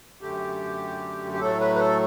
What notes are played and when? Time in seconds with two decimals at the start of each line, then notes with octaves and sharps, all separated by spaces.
0.21 F#2 D3 A3 G4
1.32 G4
1.40 A2 F#3 A3 A4
1.61 B4
1.75 B4
1.80 A4